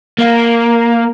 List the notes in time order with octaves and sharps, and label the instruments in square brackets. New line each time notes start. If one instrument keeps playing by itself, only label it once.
[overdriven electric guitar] A#3